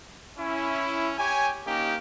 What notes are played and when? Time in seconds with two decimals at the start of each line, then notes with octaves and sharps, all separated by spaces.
0.38 C#4 E4
1.18 G4 C#5 G#5
1.67 A#3 C#4 D#4 G4